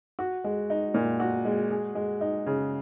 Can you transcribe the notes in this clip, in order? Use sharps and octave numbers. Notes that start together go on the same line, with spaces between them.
F#4
G#3
D#4
A#2
F#4
G#3
G#4
G#3
D#4
C#3